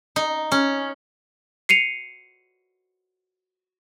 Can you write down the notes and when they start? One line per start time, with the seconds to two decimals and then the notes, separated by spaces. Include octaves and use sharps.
0.16 D#4
0.52 C#4
1.69 C7 C#7 D#7 F7